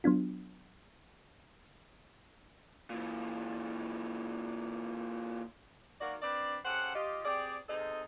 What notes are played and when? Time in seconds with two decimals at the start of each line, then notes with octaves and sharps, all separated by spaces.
0.04 F#3 B3 D4 F4
2.90 A#2 E3
6.01 D#3 F#3 A#3 F#4 D5
6.22 C4 D4 B4 D5
6.65 C#3 G4 A4 C5 F#5
6.96 F4 G4 D#5
7.25 C4 G4 G#4 D5
7.69 C3 D#4 G#4 A4 C5 D#5